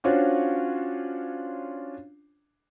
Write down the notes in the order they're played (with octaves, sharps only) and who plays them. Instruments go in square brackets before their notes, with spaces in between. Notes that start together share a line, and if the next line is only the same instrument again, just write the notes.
[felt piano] C#4 D4 F4 F#4 C5 C#5